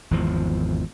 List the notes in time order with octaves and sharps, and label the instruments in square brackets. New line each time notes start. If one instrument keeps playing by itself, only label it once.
[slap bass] G#1 E2 F3